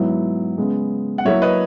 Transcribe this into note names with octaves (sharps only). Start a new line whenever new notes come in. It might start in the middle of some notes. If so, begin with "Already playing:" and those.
Already playing: G#2 F#3 B3 E4
C#3 G#3 B3
F#5
F#3 A#3 E4 C#5 E5
B4 D#5